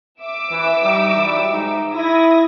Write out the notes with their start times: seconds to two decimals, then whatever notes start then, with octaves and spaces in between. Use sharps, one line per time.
0.20 E5 D6 E6
0.51 E3
0.83 G3 D#4
1.14 E3 F#3 G3
1.50 G#2 D#4
1.94 E4 D#6 G#6 A#6